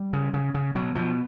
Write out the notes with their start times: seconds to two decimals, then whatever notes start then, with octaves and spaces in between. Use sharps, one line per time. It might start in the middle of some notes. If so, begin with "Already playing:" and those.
Already playing: G3
0.13 C#3
0.34 C#3
0.54 C#3
0.75 B2 F#3
0.95 B2 F3